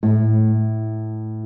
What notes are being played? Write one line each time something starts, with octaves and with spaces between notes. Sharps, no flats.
A2